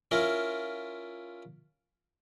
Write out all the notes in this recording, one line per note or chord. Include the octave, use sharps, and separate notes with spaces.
C#4 E4 F4 A#4